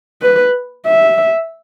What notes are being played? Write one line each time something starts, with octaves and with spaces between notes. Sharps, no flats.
B4
E5